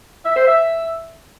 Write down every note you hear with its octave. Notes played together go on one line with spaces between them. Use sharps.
E5
C5
E5